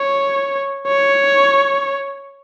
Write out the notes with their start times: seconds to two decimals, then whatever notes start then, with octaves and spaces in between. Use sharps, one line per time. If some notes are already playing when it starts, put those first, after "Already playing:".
Already playing: C#5
0.88 C#5